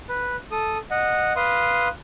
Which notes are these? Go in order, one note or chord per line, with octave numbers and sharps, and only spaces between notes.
B4
A4 D#6
D#5 F#5
B4 F5 C6 D#6